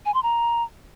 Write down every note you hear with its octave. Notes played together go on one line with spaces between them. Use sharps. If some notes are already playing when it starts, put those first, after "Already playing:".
G#5
C6
A#5